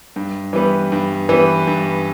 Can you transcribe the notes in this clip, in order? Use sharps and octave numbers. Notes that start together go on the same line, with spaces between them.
G2
E3 G3 B3
G2
E3 G3 B3
G2